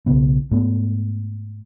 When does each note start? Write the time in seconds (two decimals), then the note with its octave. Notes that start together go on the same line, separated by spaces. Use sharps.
0.06 B1 G2 C#3 B3
0.51 G#2 A3 B3